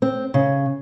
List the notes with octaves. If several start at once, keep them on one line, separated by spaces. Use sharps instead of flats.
C4
C#3